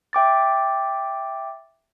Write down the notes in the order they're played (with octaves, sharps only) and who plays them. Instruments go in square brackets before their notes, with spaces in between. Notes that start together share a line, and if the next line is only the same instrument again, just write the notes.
[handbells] E5 G5 D6 A6